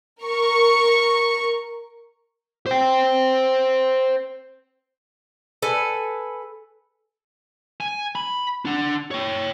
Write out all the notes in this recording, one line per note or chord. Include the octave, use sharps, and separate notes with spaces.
A#4 C#6 C#7
C5 G5
A4 B4 G#5
G#5
B5
D4 F#5
C#5 G5